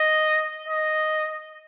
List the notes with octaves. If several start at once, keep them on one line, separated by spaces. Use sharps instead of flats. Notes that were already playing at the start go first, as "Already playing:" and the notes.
Already playing: D#5
D#5